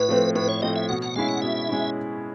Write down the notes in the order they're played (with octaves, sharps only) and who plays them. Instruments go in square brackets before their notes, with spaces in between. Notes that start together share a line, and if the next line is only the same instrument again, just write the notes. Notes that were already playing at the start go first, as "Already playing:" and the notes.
Already playing: [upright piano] A2 [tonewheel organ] B4
[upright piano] F3 A3 C4
[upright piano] A2 [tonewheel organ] B4
[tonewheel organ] C#5
[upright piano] F3 A3 C4 [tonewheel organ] D#5
[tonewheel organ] E5
[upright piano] B2 [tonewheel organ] F#5
[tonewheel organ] F#5
[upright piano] G#3 C#4 E4 [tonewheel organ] F5
[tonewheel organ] F#5
[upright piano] B2 [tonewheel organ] E5
[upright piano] G#3 C#4 E4